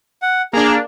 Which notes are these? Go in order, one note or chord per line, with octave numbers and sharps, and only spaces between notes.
F#5
A#3 D4 G#4 A#5